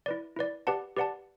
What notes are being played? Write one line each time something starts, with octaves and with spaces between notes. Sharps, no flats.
E4 B4 D5
E4 B4 D5
G4 B4 D5 F#5 A5
G4 B4 D5 F#5 A5